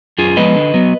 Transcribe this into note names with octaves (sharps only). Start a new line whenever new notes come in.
F#2 F4 G#4
F3 G#3 B3 B4 D#5
D3
F#3 B3